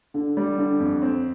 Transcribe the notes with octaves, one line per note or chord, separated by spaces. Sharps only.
D3
G3
D3
F2
C4